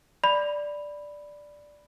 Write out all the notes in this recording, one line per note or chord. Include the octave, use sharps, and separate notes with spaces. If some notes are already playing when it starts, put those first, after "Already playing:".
D5 B5